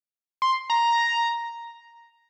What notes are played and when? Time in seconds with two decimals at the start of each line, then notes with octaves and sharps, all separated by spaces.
0.42 C6
0.70 A#5